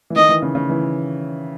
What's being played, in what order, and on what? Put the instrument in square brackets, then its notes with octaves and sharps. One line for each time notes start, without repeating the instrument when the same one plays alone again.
[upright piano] E3
[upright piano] D#3 [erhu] D#5
[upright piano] E3
C#3
C#3
E3